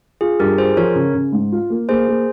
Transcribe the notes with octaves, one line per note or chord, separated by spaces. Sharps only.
F4 G#4
G2 G4 A#4
F4 G#4 C5
F3 A#4 C#5
C#3
C#3
G#2
F4
A#3
A#3 G#4 C5
A#3